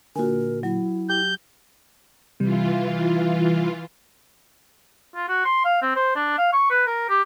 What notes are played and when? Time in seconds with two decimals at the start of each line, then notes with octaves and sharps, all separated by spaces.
0.16 A#2 D3 F#4 A#4 G#5
0.63 F#3 E4
1.10 G4 G6
2.40 C3 E3 G3 F4
5.15 F4
5.29 F#4
5.45 C6
5.65 F5
5.82 C4
5.96 C5
6.16 D4
6.38 F5
6.53 C#6
6.70 B4
6.87 A#4
7.09 G4